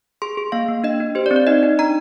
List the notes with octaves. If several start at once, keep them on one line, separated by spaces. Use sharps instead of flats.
G#4 C6
G#4
A#3 F5
A#3
D4 D#5
D4
G4 C5
D5
C4
D5
D#4 D#5
D#4
D4 A#5